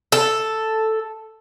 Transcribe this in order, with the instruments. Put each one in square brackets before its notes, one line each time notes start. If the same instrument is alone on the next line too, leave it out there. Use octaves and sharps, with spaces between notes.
[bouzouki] A4